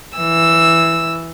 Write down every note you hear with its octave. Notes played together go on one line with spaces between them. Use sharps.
E3 E6